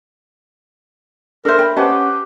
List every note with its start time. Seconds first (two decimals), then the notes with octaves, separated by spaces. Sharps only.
1.45 D4 A4 A#4 C5 E5
1.59 G5 B5
1.77 C#4 G4 B4 C5 D#5 F#5 A5